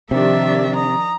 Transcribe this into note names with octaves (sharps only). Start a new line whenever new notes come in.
C3 D#3 F3 D4 G4 E5
A#5 D#6